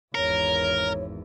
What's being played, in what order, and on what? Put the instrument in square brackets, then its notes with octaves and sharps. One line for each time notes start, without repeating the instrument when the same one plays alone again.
[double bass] G#1 E2 [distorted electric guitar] A#4 [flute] C#5